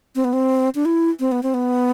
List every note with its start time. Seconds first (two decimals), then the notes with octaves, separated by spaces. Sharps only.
0.16 C4
0.24 B3
0.33 C4
0.75 D4
0.85 E4
1.20 C4
1.32 B3
1.43 C4
1.54 B3